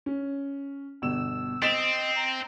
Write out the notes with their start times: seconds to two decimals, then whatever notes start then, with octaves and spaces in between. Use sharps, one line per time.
0.06 C#4
1.02 G1 B2 E6 E7
1.62 C4 D#5 A6 B6 E7
2.16 A#5